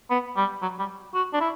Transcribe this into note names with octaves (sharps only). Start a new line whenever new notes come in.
B3
G3
F#3
G3
F#4
D4
E4